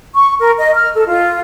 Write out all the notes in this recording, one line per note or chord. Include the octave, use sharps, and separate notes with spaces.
C#6
A#4
D#5
F6
A4
F4